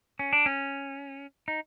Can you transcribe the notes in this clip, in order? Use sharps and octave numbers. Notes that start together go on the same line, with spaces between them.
C#4
D4
C#4
D#4